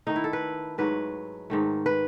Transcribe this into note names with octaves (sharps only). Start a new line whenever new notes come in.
D#3 A3 D#4
E4
A4
B4
G#2 F#3 A3 B4
G#2 D#3 A3
B4